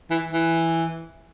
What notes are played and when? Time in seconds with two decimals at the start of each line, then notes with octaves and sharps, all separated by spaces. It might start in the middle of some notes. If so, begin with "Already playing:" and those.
0.11 E3
0.33 E3